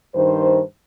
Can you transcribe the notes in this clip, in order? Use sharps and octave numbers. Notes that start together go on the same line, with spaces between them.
G2 D#3 C5